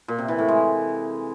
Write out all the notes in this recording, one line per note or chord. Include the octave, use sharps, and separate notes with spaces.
A#2
C3
E3
A2
G#3